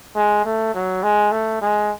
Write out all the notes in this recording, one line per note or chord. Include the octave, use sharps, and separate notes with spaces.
G#3
A3
F#3
G#3
A3
G#3